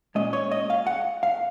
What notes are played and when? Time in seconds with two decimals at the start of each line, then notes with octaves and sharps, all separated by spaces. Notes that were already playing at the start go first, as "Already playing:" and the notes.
0.15 A#2 G#3 C#4 D#5
0.33 C#5
0.52 D#5
0.70 F5
0.87 F#5
1.23 F5